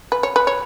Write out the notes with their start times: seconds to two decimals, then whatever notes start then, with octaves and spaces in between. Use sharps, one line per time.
0.12 B4
0.23 C#5
0.36 B4
0.47 C#5